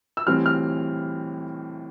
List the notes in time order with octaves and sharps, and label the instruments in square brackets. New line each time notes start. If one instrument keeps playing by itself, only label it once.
[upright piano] E6
A2 E3 G3 C4 F6
F6